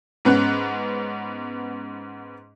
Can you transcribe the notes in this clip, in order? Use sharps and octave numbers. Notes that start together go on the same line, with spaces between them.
G#2 B3 C#4 F#6